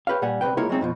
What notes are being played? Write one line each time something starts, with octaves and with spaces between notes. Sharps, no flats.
G4 B4 C#5 F5
A#2 G3 F#5 G#5
C2 C3 D#3 B4 G5
G#3 A#3 E4 F4 A#4 C#5
F#3 G#3 A3 C4 D#4
F2 B2 F3